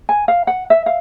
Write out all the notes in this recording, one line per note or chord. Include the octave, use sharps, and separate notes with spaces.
G#5
F5
F#5
E5
F5